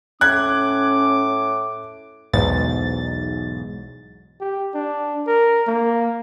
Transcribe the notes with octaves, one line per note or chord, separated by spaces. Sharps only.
A2 C#4 D6 F#6 G#6
B1 E2 G#2 A6
G4
D4
A#4
A#3